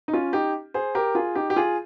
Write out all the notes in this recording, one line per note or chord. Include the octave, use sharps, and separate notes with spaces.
D#4
C#4 F4
D#4 G4
G#4 C5
G4 A#4
F4 G#4
D#4 G4
G4
F4 G#4